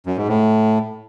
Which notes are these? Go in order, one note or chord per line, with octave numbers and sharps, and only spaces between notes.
F#2
G#2
A2